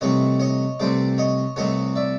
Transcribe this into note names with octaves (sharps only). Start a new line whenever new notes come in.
C2 C3 E3 A3 C4 C#5 D#5
C#5 D#5
C2 C3 E3 A3 C4 C5 D5
C#5 D#5
C2 C3 E3 A3 C4 C#5 D#5
D5 E5